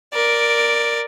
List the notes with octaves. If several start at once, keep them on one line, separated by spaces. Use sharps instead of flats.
A#4 D5